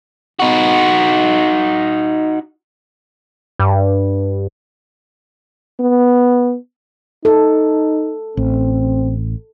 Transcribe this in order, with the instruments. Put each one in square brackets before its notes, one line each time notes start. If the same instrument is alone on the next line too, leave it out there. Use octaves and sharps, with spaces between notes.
[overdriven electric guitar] D#4 F#4
[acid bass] G2
[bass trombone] B3
[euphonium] D#4 [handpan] A4
[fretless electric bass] A1 [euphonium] C4